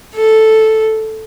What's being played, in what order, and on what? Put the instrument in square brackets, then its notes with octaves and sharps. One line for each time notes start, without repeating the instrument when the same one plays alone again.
[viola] A4